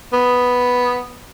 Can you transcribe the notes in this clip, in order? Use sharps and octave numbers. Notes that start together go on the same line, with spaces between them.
B3